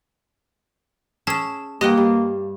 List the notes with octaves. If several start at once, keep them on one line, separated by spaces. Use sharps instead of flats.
C#4 G#4 A4 A5 E7
G2 A#3 G4 D#5 F#5 G5
G2 G3